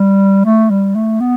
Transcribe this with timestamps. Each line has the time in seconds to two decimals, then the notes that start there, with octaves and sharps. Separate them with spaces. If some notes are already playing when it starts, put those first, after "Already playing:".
Already playing: G3
0.45 A3
0.70 G3
0.95 A3
1.20 B3